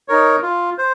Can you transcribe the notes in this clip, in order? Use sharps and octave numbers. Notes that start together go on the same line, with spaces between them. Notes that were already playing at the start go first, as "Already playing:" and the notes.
D#4 A#4 C#5
F4
C5